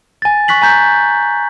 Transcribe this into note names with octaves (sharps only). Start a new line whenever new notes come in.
G#5 A6
G#5 C#6 F#6 B6 F#7
G#5 A#5 G6 B6